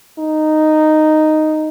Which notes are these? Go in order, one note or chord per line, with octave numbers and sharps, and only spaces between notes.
D#4